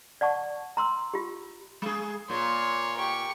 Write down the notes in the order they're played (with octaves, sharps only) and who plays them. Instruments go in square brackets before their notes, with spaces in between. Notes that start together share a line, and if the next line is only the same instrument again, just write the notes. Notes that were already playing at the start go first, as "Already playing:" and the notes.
[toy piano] D5 F#5 A5 C#6
A#5 C6 E6
F4 G4
[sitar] G#3 G#4
[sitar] A#2 [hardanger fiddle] C#5 C6
[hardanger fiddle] G4 C#6